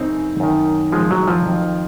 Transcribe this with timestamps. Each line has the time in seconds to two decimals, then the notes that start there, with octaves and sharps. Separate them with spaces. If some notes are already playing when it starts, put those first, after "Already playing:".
Already playing: F#2 C#3 C4 D#4
0.40 F#2 D#3
0.92 F3 G#3
1.11 F#3
1.28 F3
1.46 F2 D#3